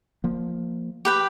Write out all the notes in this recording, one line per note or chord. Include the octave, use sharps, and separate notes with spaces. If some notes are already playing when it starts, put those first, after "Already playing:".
F3 A#3
G4 B4 G5